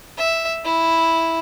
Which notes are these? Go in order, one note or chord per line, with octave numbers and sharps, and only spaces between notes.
E5
E4